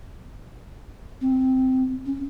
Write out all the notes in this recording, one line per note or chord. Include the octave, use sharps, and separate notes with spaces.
C4
C#4